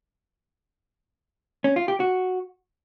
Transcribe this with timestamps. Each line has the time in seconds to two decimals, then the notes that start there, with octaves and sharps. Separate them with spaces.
1.64 C#4
1.76 F4
1.88 G4
2.00 F#4